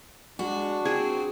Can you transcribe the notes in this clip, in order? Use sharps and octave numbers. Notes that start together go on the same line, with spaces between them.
G#3 D4 F#4
C4 G#4